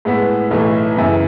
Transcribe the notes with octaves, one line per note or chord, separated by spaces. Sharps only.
A2 G#3 B3 E4
B1 A2 E3 A3
F#2 C#3 E3